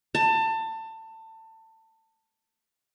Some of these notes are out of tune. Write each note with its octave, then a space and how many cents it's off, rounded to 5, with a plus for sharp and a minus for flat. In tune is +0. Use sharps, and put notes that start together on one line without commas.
A5 +25